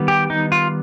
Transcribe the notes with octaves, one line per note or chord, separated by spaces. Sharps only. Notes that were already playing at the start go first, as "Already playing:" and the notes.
Already playing: D#3 G3 B3
G4
D#4
F4